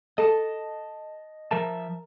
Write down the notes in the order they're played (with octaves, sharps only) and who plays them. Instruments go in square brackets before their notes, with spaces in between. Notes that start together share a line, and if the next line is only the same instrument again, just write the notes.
[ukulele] A4 [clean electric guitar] D#5 A5
[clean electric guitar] F3 E5 A5 [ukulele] A#4